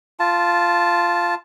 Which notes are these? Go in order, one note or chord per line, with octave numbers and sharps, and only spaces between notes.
F4 A5